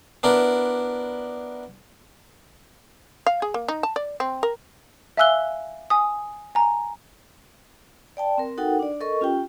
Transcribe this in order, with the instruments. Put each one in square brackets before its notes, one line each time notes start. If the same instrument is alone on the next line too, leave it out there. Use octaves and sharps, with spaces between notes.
[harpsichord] B3 D4 E4 A#4
[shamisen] F5
G#4
A#3
D#4
A5
D5
C4
A#4
[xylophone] E5 F5 G#5 E6 F#6 G7
G#5 D#6
G#5 A#5
[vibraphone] D5 G5 A5
C4 A#4
D#4 F#4 A4 A#4 F#5 G5
D4 D5
A4 A#4 D#5 C#6
C#4 F4 G4 G5